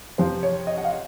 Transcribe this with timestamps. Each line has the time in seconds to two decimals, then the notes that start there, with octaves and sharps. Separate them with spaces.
0.18 F2 C3 F3 C5
0.43 C#5
0.67 D#5
0.78 F#5
0.85 F5